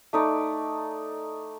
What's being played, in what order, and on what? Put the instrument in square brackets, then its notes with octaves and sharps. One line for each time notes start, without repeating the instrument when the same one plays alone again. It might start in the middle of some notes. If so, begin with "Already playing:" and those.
[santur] A3 D#4 D5